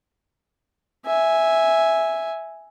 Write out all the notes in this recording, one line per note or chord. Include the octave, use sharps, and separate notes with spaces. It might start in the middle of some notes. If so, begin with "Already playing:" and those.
E5 G#5